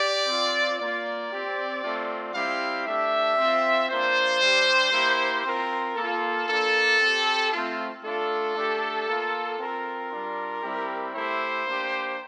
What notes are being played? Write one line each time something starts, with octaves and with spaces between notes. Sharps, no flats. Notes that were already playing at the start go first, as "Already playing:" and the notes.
Already playing: G4 D5
C4 F4
A#3 F4 D5
C4 G4
A3 C4 F4
G3 C4 E4 G4 F5
A3 D4 G4 E5
C4 F4
A#3 D4 F4 C5
G3 D4 G4
A#3 E4 G4
C4 F4 A#4
A#3 F4 A4
A#3 D4 F4 A4
C4 G4
A3 C4 F4
A3 D4 F4 A4
A3 D4 G4
A#3 F4
C4 F4 A#4
G3 D4 F4
G3 C4 E4 G4
A3 E4 G4 C5
A#3 D4 G4